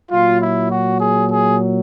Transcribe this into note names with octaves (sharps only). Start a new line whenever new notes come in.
A#2 F#3 F4
E4
F#4
G#4
G#4